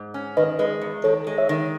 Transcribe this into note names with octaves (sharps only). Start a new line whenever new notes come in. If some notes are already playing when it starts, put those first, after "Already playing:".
Already playing: G#2
C#4
D#3 B4 D#5
G#3 B4 D#5
E2
D#3 A4 C#5
G#3
C#5 E5
D#3